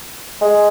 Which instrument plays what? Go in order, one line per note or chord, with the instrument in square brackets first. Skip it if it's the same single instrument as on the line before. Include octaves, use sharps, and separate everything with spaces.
[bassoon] G#3